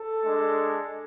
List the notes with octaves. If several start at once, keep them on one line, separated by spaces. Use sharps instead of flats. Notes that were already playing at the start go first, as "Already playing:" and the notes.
Already playing: A4
G#3 D4